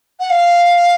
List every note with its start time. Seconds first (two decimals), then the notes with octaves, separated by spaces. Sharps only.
0.20 F#5
0.30 F5